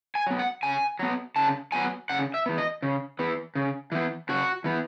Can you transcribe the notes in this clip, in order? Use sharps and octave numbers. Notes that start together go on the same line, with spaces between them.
G#5
F#3 B3
F#5
C#3 G#5
F#3 B3
C#3 A5
F#3 B3 G#5
C#3 F#5
E5
E3 B3
D#5
C#3
E3 B3
C#3
E3 B3
C#3 F#4
E3 B3